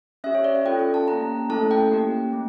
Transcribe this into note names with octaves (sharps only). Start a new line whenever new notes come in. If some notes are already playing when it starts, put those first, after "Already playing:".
C#4 G4 E5
C#5
D5
F5
C#4 F4 A4 G5
G5
A5
A#3 C#4 G4 A#5
A3 C#4 E4 A4 A5
G5
A#3 C#4 G4
A3